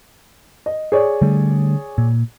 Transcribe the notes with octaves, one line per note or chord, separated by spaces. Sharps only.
D#5
G#4 C#5 D5
D3 G3 A3
A#2